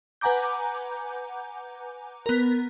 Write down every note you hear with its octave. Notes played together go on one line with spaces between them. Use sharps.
B4 F#5 G#5 A#5 D6 G6
B3 A#4